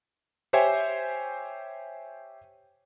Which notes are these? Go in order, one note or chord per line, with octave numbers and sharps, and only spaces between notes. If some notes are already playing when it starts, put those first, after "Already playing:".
G4 C5 C#5 E5 G5 G#5